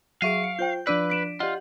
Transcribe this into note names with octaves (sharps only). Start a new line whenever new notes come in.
F#3 G#4 E5 F5 C#6 D7 D#7
C#7
F4 C5 G5 G6
F3 D4 B4 D5 E6 D#7
B6 D7 E7
F4 G4 D5 D#5 F#5